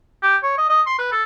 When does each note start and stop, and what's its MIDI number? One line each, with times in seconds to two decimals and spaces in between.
0.23 0.36 67
0.43 0.57 73
0.58 0.65 75
0.69 0.82 75
0.86 0.98 84
0.98 1.12 71
1.12 1.23 69